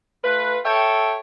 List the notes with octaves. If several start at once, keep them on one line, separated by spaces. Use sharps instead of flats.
A3 F4 B4
A4 C#5 E5 G5